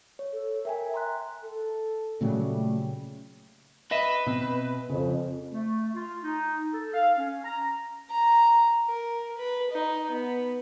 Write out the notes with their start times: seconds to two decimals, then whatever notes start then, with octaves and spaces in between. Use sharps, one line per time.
0.19 C#5
0.33 A4
0.65 A#4 E5 G5 G#5
0.94 A#5 C6 F#6
1.43 A4
2.21 A#2 C#3 F#3 G3 A3
3.91 B4 D#5 E5
4.27 B2 C4
4.90 F2 C#3
5.52 A3
5.94 F4
6.24 D#4
6.71 A4
6.93 F5
7.17 C#4
7.44 A#5
8.10 A#5
8.87 A#4
9.38 B4
9.71 D#4
10.11 B3